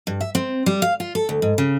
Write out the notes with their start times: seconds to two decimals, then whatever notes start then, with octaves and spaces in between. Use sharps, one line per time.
0.07 G2
0.21 E5
0.35 C4
0.66 G3
0.82 F5
1.00 F4
1.15 A4
1.29 D2
1.42 G#2
1.58 C#3